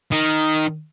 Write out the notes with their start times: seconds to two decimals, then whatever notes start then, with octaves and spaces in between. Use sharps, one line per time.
0.12 D#3